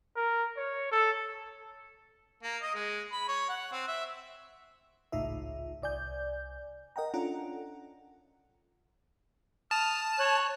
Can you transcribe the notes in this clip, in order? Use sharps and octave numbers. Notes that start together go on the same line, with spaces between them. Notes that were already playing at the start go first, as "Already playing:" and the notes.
A#4
C#5
A4
A#3
D#5
G#3
B5
C#5
F#5
C4
E5
G#1 C#2 A2 D#4 F4 E5
C2 D5 G#5 G6
A#4 D#5 F#5 G5 A#5
C#4 D4 F4 A4 F#5 A#5
A5 D#6 F6
C#5 F#6